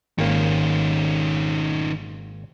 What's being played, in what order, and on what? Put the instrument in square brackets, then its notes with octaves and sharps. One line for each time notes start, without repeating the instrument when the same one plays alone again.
[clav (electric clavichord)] G#1 A#3 [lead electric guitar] D#3 C#4